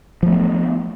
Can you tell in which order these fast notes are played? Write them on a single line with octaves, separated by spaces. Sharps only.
F3 A3 B3